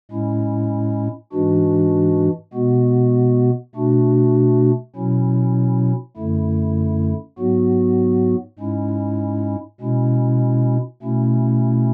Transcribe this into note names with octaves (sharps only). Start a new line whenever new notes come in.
A2 G#3 C#4 E4
G#2 E3 G#3 D4 F#4
B2 G#3 B3 F#4
B2 A3 D4 F#4
B2 F#3 C#4 E4
F#2 D3 A3 E4
G#2 F#3 B3 F#4
G#2 G#3 C#4 E4
B2 G#3 C#4 E4
B2 A3 C#4 E4